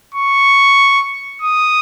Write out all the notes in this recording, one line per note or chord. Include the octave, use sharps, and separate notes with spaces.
C#6
D#6